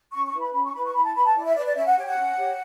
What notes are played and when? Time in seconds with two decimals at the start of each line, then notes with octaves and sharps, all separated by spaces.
0.12 C#4 C#6
0.26 C#6
0.33 E4 B4
0.40 B5
0.53 C#4 B5
0.63 C#6
0.73 E4 B4 B5
0.85 C#6
0.94 E4 B5
1.04 A5
1.14 B4 B5
1.25 A5
1.35 E4 D5
1.45 E5
1.55 B4 D5
1.66 D5
1.75 C#4 E5
1.86 F#5
1.97 G4 C#5 G5
2.06 F#5
2.17 C#4
2.37 G4 C#5